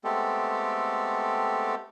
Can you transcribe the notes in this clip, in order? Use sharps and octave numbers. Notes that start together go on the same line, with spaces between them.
G#3 A3 B3 C4 G4 A4